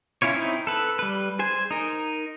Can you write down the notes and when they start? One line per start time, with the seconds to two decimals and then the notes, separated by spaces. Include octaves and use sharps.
0.22 C#4 E4 F4 C#5
0.34 C4 D#4 E4
0.67 A4 B4
0.99 G3 B4
1.39 G#4 C5 G#5
1.71 D#4 A#4